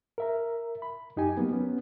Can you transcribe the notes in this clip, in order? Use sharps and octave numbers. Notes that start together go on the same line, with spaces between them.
A#4 E5 A#5
B5
F#2 D#4 G4 G#5
F#3 A#3 B3
B3 C#4